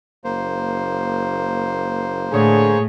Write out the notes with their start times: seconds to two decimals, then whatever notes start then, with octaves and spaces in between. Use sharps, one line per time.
0.24 F#1 A#3 C5
2.33 A2 D3 G#4 C#5